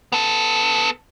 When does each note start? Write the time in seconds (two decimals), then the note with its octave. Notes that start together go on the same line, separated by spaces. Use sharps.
0.12 B3 A4